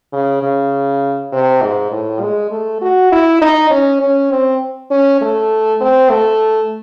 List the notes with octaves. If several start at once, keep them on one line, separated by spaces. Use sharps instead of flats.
C#3
C#3
C3
G#2
A2
G#3
A3
F#4
E4
D#4
C#4
C#4
C4
C#4
A3
C4
A3